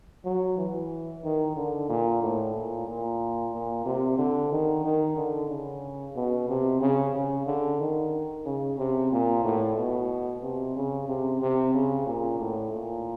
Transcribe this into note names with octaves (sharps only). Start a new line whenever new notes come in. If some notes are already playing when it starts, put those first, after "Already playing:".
F#3
E3
D#3
D3
A#2
A2
A#2
A#2
A#2
C3
D3
D#3
D#3
D3
C#3
B2
C3
C#3
C#3
D3
D#3
C#3
C3
A#2
A2
B2
C3
C#3
C3
C3
C#3
A#2
A2
A#2